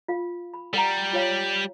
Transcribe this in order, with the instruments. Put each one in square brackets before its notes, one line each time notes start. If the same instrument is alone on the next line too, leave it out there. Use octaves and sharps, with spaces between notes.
[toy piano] F4 F5
B5
[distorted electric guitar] G3 [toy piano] A#4 F#5 A#5
[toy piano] F4 C#5 F5